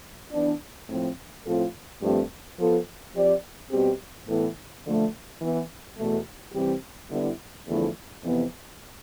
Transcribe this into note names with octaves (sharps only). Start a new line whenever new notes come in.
E3 B3 D4
A2 F3 C4
A2 F3 C4 F4 A4
G2 F3 A3 C4 G4
F3 B3 F4 A4
F3 C4 G4 D5
B2 G3 C4 G4
A2 E3 B3 E4 A4
D3 F3 A3
E3 B3 E4
E2 B2 A3
C3 E3 G3 C4 G4
D3 G3 B3 E4
E2 D3 F3 A3 E4
F2 C3 E3 B3